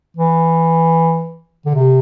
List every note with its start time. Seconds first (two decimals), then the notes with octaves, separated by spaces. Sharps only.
0.17 E3
1.66 D3
1.75 C3